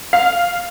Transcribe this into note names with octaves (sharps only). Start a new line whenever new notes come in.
F5